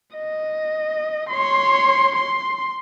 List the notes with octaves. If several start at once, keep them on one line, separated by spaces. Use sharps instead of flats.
D#5
C#5 C6
C6